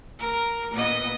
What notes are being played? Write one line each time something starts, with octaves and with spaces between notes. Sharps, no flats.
A#4
A#2 B3 D#5